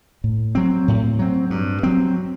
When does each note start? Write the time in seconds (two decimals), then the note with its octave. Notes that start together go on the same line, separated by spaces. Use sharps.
0.24 A2
0.55 F#3 C4
0.88 A2
1.19 F#3 C4
1.50 G2
1.83 F#3 C4